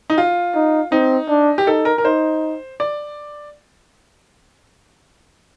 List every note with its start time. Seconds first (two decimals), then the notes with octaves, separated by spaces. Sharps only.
0.10 D#4
0.18 F4
0.55 D#4
0.92 C4 D#4
1.29 D4
1.58 G4
1.67 D#4 A4
1.85 A#4
1.98 A#4
2.05 D#4 C5
2.80 D5